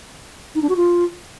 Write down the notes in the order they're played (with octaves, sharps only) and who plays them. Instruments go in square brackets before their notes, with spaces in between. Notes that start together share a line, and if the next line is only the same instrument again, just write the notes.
[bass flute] D#4
D4
F#4
F4